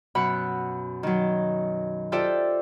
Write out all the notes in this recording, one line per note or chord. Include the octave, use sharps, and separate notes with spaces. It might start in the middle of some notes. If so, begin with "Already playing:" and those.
F#2 B2 F#5 B5
D#3 F#3
F4 G4 A4 C5 D5 E5